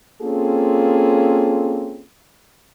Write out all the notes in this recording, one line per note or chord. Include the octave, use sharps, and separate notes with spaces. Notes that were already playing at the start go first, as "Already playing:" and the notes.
A#3 C4 C#4 F4 G#4 A4